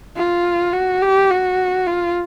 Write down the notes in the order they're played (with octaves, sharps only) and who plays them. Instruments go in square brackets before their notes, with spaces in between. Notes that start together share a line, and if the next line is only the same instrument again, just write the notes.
[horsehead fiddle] F4
F#4
G4
F#4
F4